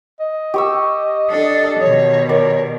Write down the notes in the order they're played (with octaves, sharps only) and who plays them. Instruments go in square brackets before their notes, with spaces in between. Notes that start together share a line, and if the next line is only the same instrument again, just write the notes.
[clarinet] D#5
[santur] G4 C#6 E6
[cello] D4 A4
[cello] B2 D#3 [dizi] C#5
[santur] A#4 D5 [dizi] C#5